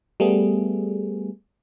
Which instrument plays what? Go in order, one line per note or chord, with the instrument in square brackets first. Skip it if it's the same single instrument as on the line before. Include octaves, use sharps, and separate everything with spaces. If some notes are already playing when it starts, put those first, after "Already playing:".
[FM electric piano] G3 A3 B3 G#4